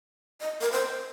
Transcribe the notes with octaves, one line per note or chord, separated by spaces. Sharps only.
D#5
A#4
C5